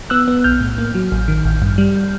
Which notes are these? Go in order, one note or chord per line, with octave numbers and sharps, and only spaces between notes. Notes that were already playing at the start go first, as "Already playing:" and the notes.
B3 E6 F#6
B3
B1 F6 G6
A2
A#3
F#3
A1
D#3
A1
G2
G3